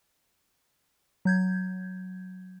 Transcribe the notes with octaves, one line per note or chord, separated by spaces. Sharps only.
F#3 G6 G#6